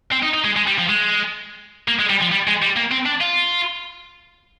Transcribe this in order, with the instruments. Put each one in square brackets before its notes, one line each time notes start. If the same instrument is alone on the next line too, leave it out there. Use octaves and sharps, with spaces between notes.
[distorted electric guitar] C4
D#4
D#4
G#3
G#3
G3
F3
G#3
A#3
G#3
G3
F3
G3
G#3
G3
A#3
C4
D4
F4